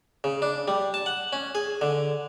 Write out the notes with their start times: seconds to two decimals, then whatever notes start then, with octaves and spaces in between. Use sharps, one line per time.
0.24 C#3
0.42 D4
0.68 G3
0.94 A5
1.06 F#5
1.33 C#4
1.55 G#4
1.81 D3